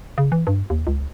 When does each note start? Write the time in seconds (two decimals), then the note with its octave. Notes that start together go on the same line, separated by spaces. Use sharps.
0.18 C#3
0.32 E3
0.47 G2
0.70 D#2
0.87 C#2